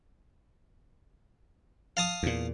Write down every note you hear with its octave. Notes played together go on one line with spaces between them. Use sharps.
F5 A5 D#6
E2 A#2